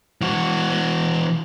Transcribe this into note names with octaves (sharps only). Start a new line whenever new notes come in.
E3 F#4